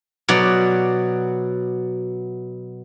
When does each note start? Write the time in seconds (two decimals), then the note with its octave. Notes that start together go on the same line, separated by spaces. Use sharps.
0.28 B2 F#3 D5